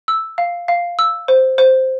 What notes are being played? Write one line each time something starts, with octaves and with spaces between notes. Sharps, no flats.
E6
F5
F5
E6
C5
C5